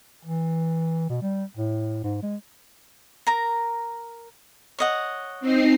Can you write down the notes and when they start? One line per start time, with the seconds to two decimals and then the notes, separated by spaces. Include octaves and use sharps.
0.25 E3
1.10 B2
1.22 G3
1.57 A2
2.04 G#2
2.23 G#3
3.27 A#4 A#5
4.79 C#5 D#5 F#5
5.41 C4 D#4 C7